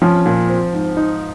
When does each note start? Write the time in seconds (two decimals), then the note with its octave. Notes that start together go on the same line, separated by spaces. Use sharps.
0.02 F3 C#4
0.26 A#2
0.49 C4
0.73 G#2
0.97 D#4